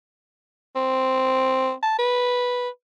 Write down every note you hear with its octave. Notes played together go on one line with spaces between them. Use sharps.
C4
A5
B4